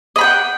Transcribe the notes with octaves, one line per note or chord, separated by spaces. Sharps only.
D#5 F#5 G5 B5